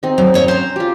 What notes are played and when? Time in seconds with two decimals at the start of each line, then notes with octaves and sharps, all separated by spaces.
0.03 C4 D#4
0.18 F#3
0.34 D#2 C#5 D#5
0.48 C#4 C5 A#5
0.76 F4 G4